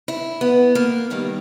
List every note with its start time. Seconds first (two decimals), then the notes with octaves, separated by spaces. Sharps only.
0.08 E4
0.41 B3
0.75 A#3
1.10 G2 D#3 G3 A#3